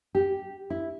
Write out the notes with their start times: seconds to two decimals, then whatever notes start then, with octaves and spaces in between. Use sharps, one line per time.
0.15 G4
0.70 E4